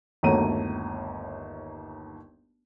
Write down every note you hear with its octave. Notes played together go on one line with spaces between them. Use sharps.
G1 D#2 A3 F#4 A#5 D#7